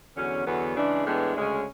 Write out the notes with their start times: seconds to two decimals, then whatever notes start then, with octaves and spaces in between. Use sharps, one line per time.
0.17 E2 D3 F#3 C#4
0.46 E2 D3 F#3 B3
0.76 C#3 E3 G#3 D4
1.06 A2 E3 G#3 B3 D4
1.35 D2 C#3 G#3 C#4